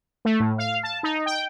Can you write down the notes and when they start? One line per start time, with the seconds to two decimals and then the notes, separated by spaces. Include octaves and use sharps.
0.25 A3
0.40 A2
0.58 F5
0.83 A5
1.03 D#4
1.26 G5